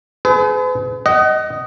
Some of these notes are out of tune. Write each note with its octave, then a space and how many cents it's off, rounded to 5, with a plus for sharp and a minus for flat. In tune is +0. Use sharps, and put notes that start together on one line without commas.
G#4 +35 B4 +45
D#5 +0 F#5 +35